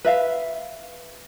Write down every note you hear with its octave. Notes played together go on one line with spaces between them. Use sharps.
B4 E5 F5